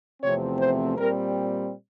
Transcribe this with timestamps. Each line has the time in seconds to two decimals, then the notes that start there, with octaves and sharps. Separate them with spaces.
0.22 E2 C3 F3 A3 C4 C#5
0.59 C5
0.97 A#2 G3 C4 A#4